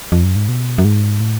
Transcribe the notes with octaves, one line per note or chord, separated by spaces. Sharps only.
F2
F#2
G#2
B2
F#2
G#2
A2